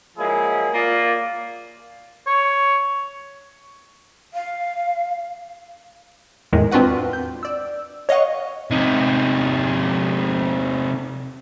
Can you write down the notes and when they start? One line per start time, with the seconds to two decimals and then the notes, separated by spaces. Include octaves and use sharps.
0.17 F3 F#3 G#3 A#3 E4 G#4
0.74 A#3 F4 D5
2.27 C#5
4.34 F5
6.53 E2 A2 D#3 G#3
6.72 C4 D4 F4 F#4 B4 F#5
7.13 G6
7.43 D5 E6
8.09 C#5 D#5 F5 F#5 C#6
8.71 C3 D#4